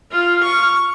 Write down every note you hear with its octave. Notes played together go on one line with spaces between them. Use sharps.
F4 F6
C#6